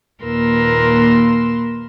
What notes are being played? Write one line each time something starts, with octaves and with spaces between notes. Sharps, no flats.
D#2 A#2 A#4 B4 C6 E6